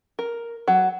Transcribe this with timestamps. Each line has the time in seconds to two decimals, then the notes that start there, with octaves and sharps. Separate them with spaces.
0.19 A#4
0.68 F#3